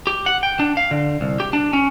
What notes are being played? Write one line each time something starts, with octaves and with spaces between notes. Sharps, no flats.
G4
F#5
G5
D4
F5
D3
C2
G4
D4
C#4